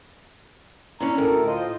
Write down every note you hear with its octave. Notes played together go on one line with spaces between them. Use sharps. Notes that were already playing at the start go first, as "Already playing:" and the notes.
D3 E3 C#4 A#5
D2 A2 A4 A#4
F4 C5 D#5